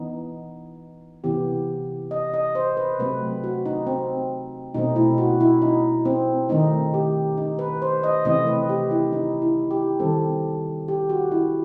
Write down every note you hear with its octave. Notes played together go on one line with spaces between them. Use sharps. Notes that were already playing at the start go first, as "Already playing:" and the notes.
Already playing: E3 B3 D#4
C3 E3 B3 G4
D#5
D#5
C5
B4
C3 F#3 A3 C4 B4
F#4
D#4
C4
B2 A3 C4 D#4
E4
F#4
E4
D#4
C4
D#3 A3 C4 D#4
G4
D#4
B4
C5
D#5
C3 E3 A3 C4 D#5
B4
G4
E4
D#4
E4
G4
D#3 G3 C4 A4
G4
F#4
E4